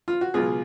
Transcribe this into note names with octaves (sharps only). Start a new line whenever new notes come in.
F4
F#4
C#2 B2 F#3 F4 G#4